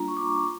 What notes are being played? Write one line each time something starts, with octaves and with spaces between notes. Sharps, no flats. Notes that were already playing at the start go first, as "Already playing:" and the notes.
Already playing: G3 A#3 D4 F4 A#5
C#6
D6
A#5